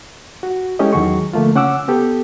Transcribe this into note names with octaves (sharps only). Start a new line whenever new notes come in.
F#4
G#3 C#4 E4 G4 A4 D#5
E2 D#3 F#3 F#4 G#4 C#6
D3 F3 A3 A#3 F4
C#3 C#4 F#5 D6 E6
B3 G4 A4